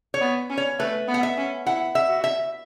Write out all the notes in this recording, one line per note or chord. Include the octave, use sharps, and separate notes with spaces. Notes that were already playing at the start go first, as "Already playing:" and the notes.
C#5
B3
C#4
C#5
A3 B4
B3
F#5
E5
C#4
E4 F#5
E5
F#4
E5